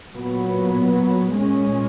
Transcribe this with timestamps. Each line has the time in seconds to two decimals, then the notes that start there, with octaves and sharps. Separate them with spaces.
0.11 A#2 F#3 B3
1.32 A#2 G#3 C#4